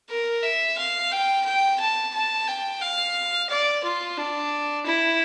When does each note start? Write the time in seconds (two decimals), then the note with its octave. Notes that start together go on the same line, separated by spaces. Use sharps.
0.09 A#4
0.43 E5
0.78 F5
1.12 G5
1.45 G5
1.80 A5
2.14 A5
2.48 G5
2.81 F5
3.50 D5
3.83 F4
4.17 D4
4.86 E4